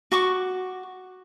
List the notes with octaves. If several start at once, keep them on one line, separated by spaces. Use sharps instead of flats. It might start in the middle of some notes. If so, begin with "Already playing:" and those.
F#4 C#6 D6